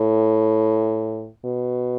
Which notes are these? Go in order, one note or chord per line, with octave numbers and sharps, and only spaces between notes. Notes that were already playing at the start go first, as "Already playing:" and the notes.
Already playing: A2
B2